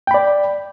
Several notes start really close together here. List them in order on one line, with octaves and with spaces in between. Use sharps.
G5 B5 D5